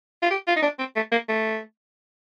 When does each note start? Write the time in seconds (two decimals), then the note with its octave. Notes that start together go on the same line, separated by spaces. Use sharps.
0.22 F4
0.31 G4
0.47 F4
0.56 D#4
0.62 D4
0.79 C4
0.96 A3
1.12 A#3
1.29 A3